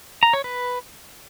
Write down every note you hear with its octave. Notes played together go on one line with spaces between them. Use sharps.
A#5
C#5
B4